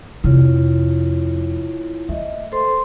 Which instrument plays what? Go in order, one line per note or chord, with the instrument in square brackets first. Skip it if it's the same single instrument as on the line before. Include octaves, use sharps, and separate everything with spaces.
[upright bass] F2 C3 [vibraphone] E4 F4 C#5
[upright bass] A3 [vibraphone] D#5 E5
[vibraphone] A4 C5 C6